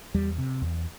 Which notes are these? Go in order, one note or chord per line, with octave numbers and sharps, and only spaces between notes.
E2 G3
C3
E2